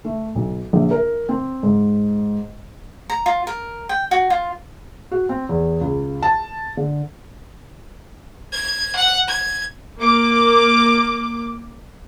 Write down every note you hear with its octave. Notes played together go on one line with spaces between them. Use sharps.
A3
B1
A#1
A#4
C4
G#2
A#5
F4
A#4
G5
F#4
F4
F#4
C4
E2
C#2
A5
D3
G#6
F#5
G#6
A#3 D6